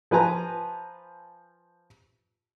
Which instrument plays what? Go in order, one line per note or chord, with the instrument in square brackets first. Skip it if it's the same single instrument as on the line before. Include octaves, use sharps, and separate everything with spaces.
[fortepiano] F3 B4 G#5 A#5